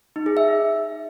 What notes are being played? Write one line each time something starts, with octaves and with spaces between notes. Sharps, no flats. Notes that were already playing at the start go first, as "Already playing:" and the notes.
D#4
G#4
E5